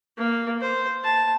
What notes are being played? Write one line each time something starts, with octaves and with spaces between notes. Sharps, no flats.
A#3
C5
A5